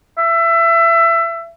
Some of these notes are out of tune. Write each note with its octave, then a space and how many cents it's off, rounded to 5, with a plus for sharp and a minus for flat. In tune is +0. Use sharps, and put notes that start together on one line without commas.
E5 +25